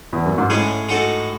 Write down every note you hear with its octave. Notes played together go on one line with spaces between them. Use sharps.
E2
F#2
G#2
A2 G#3 C#4 G#4
G#3 D#4 F#4 A4